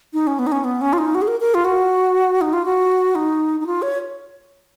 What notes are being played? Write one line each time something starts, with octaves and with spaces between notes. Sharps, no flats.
D#4
C#4
B3
D#4
C#4
B3
C#4
F4
D#4
F#4
G#4
A#4
A#4
F4
F#4
D#4
F4
F#4
D#4
D#4
F4
C#5